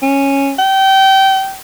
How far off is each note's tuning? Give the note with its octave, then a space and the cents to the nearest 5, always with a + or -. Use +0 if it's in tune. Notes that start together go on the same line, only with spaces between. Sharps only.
C#4 -5
G5 -25